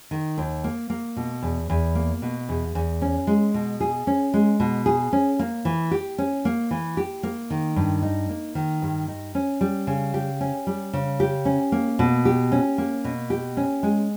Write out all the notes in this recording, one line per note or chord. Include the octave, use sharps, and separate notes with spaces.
D#3
D#2
A#3
A#3
B2
E2
E2
A#3
B2
E2
E2
C#4
G#3
B2
G#4
C#4
G#3
B2
G#4
C#4
A#3
E3
G4
C#4
A#3
E3
G4
A#3
D#3
G2
D#4
A#3
D#3
G2
D#4
C#4
G3
C#3
G4
C#4
G3
C#3
G4
C#4
A#3
B2
G4
C#4
A#3
B2
G4
C#4
G#3